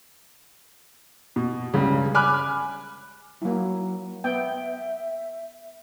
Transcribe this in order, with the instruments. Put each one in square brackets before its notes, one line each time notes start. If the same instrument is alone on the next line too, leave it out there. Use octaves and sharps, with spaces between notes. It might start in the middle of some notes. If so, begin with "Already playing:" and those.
[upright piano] B2
C#2 G2 C#3
G#5 B5 D6 F6 F#6
[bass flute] F#3 [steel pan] A#3 E4
[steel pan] B3 G5 [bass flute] E5